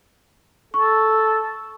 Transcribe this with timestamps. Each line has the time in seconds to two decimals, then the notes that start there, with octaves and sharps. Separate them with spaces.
0.74 A4 C#6